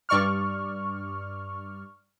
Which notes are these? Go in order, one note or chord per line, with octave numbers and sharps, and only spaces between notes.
G2 D5 C#6 F6